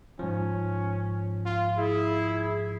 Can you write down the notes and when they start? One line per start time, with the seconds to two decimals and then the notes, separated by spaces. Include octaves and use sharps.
0.19 G#2 F3 C#4
1.45 F4
1.77 E4 G#4